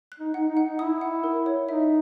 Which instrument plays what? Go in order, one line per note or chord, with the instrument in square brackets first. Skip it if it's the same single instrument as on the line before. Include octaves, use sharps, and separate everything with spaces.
[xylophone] F#6
[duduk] D#4
[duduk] D#4 [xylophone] F#5
[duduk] D#4
[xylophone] F#5
[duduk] D#4
[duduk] E4 [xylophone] D#6
[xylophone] F#5
A#4
C#5
[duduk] D#4 [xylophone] E5